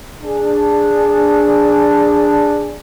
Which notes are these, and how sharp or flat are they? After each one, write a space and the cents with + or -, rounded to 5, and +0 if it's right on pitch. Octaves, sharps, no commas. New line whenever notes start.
D4 +0 G#4 -10